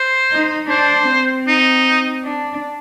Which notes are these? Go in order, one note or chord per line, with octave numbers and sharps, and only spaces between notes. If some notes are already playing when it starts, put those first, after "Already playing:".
Already playing: C5
D#4
D4 C5
C4
D#4
D4